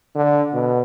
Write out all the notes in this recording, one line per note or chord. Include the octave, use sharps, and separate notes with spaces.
D3
B2